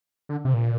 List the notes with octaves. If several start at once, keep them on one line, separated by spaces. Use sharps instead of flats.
D3
C3
A#2